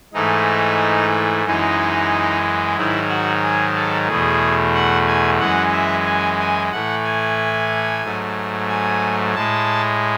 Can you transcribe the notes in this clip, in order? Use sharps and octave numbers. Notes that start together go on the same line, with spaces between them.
G#2 E3 A3 D#4
F#2 E3 G#3 D#4
G#2 D#3 F#3 E4
F#4
G#4
A4
E2 B2 A3 G#4
F#5
G#5
F#2 E3 G#3 F#5
E5
G#5
G#5
A2 E3 A3 F#5
G#5
G#2 F#3 A3
G#5
A2 G#3 A5